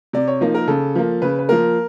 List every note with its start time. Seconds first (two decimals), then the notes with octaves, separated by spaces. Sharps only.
0.13 C3 D5
0.28 C#5
0.41 F3 A#3 D#4
0.54 A#4
0.67 C#3 A4
0.95 F3 A#3
1.22 C#3 B4
1.39 B4
1.49 F3 A#3 A#4